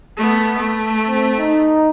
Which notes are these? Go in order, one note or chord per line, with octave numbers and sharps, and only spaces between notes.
A3 B3
A3
C4
D#4